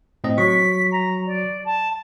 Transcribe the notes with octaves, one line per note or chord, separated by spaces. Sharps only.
A2 C4 D#5
F#3 C#6 B6
A#5
D5
A5